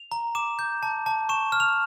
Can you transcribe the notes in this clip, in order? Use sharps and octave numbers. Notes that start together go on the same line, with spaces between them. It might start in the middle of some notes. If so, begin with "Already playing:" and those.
Already playing: F7
A#5
D6 E7
G6
A5
A5
C#6 E7
F6
F7